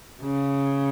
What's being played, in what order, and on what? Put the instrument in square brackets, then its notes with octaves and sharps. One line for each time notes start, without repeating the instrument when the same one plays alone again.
[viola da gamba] C#3